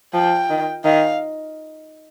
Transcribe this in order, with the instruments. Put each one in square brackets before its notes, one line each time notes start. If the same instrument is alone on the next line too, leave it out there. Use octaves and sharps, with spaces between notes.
[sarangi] F3 [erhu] G5
[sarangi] D#3
[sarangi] D#3 [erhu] F5